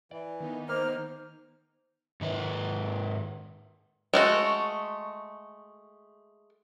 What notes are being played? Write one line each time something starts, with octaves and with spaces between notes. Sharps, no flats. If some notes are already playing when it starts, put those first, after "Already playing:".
E3 D5
D#3 B3 D#4
A#3 C5 F6
G#2 D#3 B4
G#3 A3 F#4